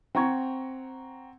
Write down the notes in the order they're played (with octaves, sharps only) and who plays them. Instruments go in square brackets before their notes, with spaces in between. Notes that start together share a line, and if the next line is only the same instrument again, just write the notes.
[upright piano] C4 F#5 A#5 C#6 G#6